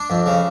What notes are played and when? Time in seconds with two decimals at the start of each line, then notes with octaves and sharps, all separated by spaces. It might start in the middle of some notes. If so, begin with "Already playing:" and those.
Already playing: D4
0.10 F2
0.26 C#3